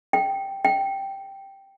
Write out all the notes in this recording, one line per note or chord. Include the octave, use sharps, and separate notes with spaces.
G5
G5